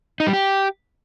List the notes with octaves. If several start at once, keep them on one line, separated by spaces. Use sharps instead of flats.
D#4
G3
G4